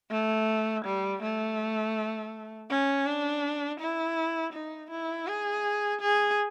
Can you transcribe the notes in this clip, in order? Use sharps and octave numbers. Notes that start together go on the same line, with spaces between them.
A3
G3
A3
C#4
D4
E4
D#4
E4
G#4
G#4